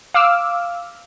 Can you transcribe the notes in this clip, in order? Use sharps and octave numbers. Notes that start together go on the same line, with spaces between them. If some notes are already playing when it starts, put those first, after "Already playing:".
F5 D6 E6 F6